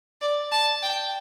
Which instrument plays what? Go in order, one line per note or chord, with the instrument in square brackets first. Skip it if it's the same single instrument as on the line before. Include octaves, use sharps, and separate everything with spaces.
[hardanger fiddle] D5
A5
G5